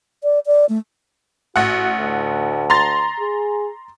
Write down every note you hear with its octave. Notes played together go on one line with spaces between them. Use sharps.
D5
D5
A3
A1 F#4 F#5
D2
A#5 C6 A6
G#4